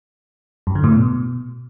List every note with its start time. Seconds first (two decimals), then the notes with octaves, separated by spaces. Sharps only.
0.67 F#2
0.75 D3
0.84 A2
0.92 B2